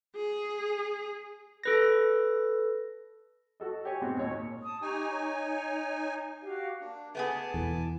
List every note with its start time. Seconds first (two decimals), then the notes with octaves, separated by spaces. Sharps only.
0.16 G#4
1.64 A4 B4 A#6
3.60 F#4 A4 D#5
3.85 G4 C#5 G#5
4.01 G#2 B2 C4 F#4
4.17 D#2 A#2 C#5
4.62 A5 D#6
4.82 D#4 G4 G#5 A#5 C#6
5.10 C#5
6.41 F#4 G4 F5
6.80 A#3 D4
7.15 A3 B3 G#4 B4 G#5 A5 D6
7.54 E2 B2 E4